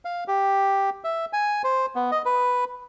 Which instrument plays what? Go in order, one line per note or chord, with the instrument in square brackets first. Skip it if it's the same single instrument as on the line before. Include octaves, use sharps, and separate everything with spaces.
[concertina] F5
G4
E5
G#5
C5
B3
D#5
B4